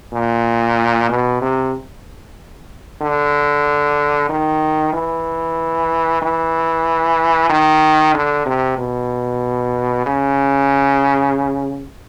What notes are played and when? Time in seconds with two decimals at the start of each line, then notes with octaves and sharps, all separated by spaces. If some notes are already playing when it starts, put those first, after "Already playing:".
0.13 A#2
1.09 B2
1.41 C3
3.02 D3
4.30 D#3
4.93 E3
6.23 E3
7.50 D#3
8.15 D3
8.46 C3
8.78 B2
10.07 C#3